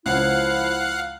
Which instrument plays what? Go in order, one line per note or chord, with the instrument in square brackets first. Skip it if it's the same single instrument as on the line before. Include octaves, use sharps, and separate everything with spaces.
[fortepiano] C#2 [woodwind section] F3 E4 [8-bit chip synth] F5 F#5 F#6